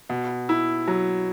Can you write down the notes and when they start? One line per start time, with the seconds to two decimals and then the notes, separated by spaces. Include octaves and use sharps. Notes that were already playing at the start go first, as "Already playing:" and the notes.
0.10 B2
0.49 E4
0.88 F#3